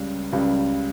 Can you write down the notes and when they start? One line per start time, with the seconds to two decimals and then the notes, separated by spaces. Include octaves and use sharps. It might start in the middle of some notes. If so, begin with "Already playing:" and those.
Already playing: C#2 C#3 G3
0.32 C#2 C#3 G3